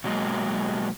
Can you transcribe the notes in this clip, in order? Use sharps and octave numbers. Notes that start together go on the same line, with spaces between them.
B2 F#3 G#3 A#3